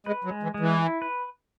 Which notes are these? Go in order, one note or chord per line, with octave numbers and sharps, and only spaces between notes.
G#3 B4
F#3
G#3
E3
G#3
E3
E4
B4